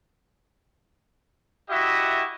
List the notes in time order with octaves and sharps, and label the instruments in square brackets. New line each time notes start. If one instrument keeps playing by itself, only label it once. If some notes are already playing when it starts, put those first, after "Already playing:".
[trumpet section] E4 F#4 G4 D#5 E5